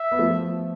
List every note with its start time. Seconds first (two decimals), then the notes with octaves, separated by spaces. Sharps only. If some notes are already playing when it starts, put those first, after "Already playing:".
Already playing: E5
0.12 B3
0.19 F3 A3